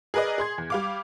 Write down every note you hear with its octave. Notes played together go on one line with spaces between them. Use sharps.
G#4 A#4 B4 D5 D#5
G#4 C6 G#6
E2
G3 F5 D6